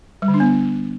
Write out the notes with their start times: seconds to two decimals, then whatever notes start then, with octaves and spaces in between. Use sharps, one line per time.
0.22 G3
0.28 D3
0.34 D4
0.40 B3